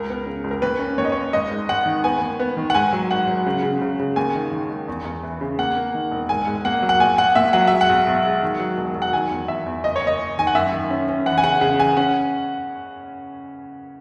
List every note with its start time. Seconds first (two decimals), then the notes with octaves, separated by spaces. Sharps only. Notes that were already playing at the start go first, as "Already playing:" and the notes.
Already playing: C#2 A#4
0.10 B3
0.26 C#3
0.44 C#2
0.51 A#4
0.62 D#2 B4
0.79 C#4
0.98 D#2 C#5
1.05 D#5
1.12 D#2 C#5
1.33 G#1 D#5
1.51 G#2
1.69 G#1 F#5
1.86 D#3
2.04 B3 G#5
2.21 D#2
2.40 B3
2.57 D#3
2.70 F#5
2.74 G#2 G#5
2.93 F#3
3.11 G#1 F#5
3.28 F#3
3.46 C#3
3.63 C#3
3.81 C#3
3.99 C#3
4.16 D#2 G#5
4.35 D#3
4.52 D#3
4.69 G#3
4.88 E2
5.05 E2
5.23 E3
5.41 C#3
5.59 A#3 F#5
5.77 A#3
5.95 D#3
6.12 E1
6.29 G#2 G#5
6.47 G#2
6.65 A#3 F#5
6.82 F#3
6.89 F#5
7.00 A#1 G#5
7.18 A#1 F#5
7.35 A#2 E5
7.53 F#3 F#5
7.67 G#3 E5
7.81 F#5
7.89 B1
8.07 B1
8.25 G#3
8.42 D#3
8.59 F#3
8.77 E1
8.95 F#3
9.02 F#5
9.13 D#3 G#5
9.31 E2
9.48 E2 E5
9.66 E2
9.84 F#1 D#5
9.96 C#5
10.01 F#1
10.07 D#5
10.20 F#1
10.38 D#3 G#5
10.47 F#5
10.55 F#2 E5
10.73 D#3
10.90 C#4
11.08 C#4
11.26 E3 F#5
11.38 G#5
11.44 C#3 F#5
11.61 C#3 F#5
11.79 E3 G#5
11.97 C#4 F#5